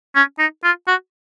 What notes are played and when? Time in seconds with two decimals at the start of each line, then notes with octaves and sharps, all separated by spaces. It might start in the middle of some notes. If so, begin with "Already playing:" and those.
0.16 C#4
0.39 D#4
0.64 F4
0.88 F#4